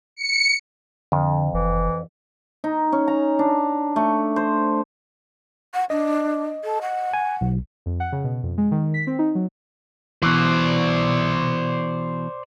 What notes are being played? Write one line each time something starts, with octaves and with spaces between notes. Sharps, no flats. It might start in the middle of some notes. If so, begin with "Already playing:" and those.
C#7
F2 D3
F#1 E3
D#4
C#4
A#5
D4
A3
C5
F#5
D4 D#5
A4
F#5
G#5
B1
F2
F#5
C#3
B2
F2
G#3
D#3
B6
C4
D#4
F#3
B2 E3 C5 D5